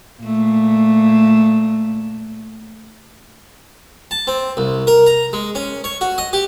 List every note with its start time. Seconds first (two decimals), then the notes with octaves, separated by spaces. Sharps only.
0.22 A#2 A3
4.11 A5
4.27 C4
4.57 C2
4.87 A#4
5.06 A#5
5.33 G#3
5.55 C#4
5.84 C#5
6.01 F#4
6.18 D#5
6.33 G4